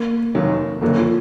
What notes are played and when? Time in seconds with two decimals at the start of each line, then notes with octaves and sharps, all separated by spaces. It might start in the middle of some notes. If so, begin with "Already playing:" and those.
Already playing: A#3
0.35 F1 D#2 D#3 F#3
0.81 F#1 F2 D3 F#3 A3 A#3
0.98 F3